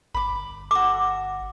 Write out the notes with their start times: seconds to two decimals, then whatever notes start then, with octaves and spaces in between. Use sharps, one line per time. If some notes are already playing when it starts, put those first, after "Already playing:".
0.14 G1 B5 D6
0.71 F#4 A4 D6